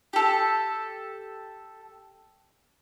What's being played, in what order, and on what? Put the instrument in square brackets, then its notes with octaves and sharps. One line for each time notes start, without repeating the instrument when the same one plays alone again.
[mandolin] G4 A4